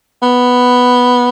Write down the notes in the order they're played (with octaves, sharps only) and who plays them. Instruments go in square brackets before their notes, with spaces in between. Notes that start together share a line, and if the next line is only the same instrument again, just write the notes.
[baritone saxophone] B3